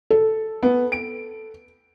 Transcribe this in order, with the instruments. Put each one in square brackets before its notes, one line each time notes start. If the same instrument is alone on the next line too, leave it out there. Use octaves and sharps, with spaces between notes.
[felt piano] A4
[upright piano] B3
D7